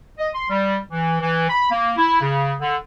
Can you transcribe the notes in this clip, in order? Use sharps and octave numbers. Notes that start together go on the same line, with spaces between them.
D#5
C6
G3
E3
E3
B5
A#3
E4
C#3
D3